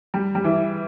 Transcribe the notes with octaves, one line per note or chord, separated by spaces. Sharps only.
G3
G3
E3